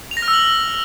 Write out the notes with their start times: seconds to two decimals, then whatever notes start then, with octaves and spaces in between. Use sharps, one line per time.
0.11 F7
0.17 A#6
0.22 F6
0.28 E6
0.33 F#7